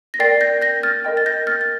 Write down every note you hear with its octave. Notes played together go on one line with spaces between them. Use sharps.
A#6
A#4 D5 G5 A6 C7
G6 A#6
G6 A#6
F6 A6
A#4 D#5 G5
A6
G6 A#6
F6 A6
A6